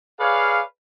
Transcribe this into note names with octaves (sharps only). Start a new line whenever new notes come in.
G#4 B4 C#5 D5 F5